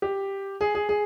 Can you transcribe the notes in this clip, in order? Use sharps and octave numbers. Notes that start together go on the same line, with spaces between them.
G4
G#4
G#4
G#4